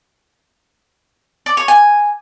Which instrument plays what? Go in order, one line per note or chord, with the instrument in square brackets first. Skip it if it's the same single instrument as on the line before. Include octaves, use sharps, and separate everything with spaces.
[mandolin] D5
C#5
G#5